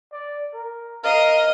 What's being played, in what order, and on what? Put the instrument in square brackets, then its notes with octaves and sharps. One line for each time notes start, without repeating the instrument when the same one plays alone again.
[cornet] D5
A#4
[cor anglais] A#4 [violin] D#5 [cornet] F5